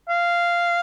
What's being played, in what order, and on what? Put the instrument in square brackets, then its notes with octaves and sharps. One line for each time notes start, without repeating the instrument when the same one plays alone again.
[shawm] F5